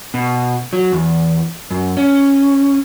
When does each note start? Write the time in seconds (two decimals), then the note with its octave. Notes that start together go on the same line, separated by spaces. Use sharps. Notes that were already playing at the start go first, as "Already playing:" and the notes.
0.14 B2
0.73 F#3
0.92 E2
1.71 F#2
1.97 C#4